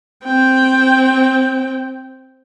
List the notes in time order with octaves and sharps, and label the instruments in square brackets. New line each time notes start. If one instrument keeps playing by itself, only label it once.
[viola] C4 G5